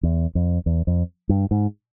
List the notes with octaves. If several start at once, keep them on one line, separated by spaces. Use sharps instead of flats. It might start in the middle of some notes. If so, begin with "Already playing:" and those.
E2
F2
E2
F2
G2
G#2